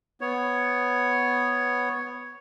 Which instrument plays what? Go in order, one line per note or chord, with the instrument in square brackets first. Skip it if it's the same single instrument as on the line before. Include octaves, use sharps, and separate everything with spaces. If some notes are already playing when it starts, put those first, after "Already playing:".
[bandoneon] B3 C#5